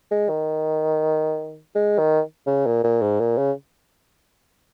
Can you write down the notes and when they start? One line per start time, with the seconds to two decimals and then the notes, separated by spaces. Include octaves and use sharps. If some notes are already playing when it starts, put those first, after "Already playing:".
0.11 G#3
0.29 D#3
1.75 G#3
1.99 D#3
2.47 C#3
2.66 A#2
2.84 A#2
3.02 G#2
3.20 A#2
3.38 C#3